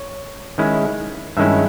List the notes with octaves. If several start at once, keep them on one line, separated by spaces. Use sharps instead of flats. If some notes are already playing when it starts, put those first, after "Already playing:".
Already playing: C#5
D#3 G#3 C#4 E4
G2 D#3 G#3 C#4 E4 E5